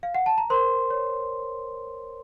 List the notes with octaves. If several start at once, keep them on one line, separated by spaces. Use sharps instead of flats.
F5
F#5
A5
A#5
A#4 C5 C6
C#5